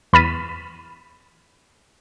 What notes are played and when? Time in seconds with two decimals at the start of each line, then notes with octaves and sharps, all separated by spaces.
0.13 E2 B5 F6 A6 B6 D#7